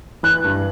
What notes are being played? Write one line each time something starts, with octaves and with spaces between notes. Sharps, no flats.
E3 F#6
G2